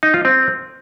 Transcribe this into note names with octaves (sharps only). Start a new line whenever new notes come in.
D#4
F4
C4